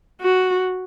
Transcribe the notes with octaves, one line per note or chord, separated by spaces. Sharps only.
F#4